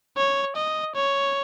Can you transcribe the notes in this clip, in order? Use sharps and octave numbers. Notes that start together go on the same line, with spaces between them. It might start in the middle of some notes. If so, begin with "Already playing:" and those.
C#5
D#5
C#5